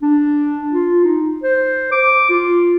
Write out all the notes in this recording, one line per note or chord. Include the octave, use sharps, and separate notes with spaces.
D4
F4
D#4
C5
D6
F4